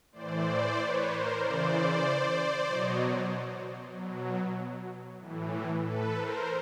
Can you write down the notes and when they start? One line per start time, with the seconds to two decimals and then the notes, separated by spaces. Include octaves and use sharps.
0.12 A2 E3 C5 D5
0.76 B4 C#5
1.07 A#4 C5
1.39 C#3 E3 C5 D5
2.65 B2 F#3 C#5 D#5
3.93 B2 F#3
5.19 A2 E3
5.83 A4 B4
6.14 A#4 C5